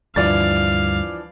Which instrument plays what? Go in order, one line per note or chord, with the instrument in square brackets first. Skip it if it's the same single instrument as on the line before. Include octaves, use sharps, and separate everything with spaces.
[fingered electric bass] D2 G2 [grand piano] E3 F3 D4 [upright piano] D5 A6 [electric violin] F5